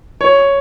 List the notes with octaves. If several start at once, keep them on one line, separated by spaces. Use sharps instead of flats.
C#5